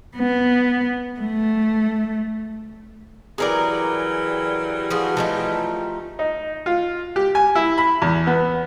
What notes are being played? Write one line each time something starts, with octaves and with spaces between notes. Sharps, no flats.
B3
A3
E3 F#3 G3 G#4 A#4 D5
F3 F#4 G#4
F3 A3 D#4
D#4
F4
G4
G#5
E4
B5
E2
B3